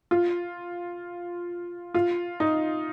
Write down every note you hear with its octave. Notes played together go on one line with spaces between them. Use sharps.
F4
F4
D#4